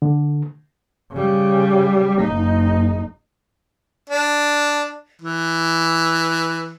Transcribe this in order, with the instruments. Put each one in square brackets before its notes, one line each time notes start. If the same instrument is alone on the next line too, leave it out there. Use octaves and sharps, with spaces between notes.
[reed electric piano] D3
[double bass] C#3 G3
F#1 D#4
[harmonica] D4
E3